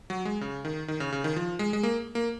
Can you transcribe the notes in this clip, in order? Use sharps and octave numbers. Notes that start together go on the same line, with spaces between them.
F#3
G#3
C#3
D#3
D#3
C#3
C#3
D#3
F3
G#3
G#3
A#3
A#3